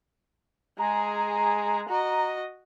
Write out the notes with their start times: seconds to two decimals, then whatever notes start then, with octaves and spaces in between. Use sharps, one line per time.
0.79 G#3 G#4 A#5
1.89 F#4 D#5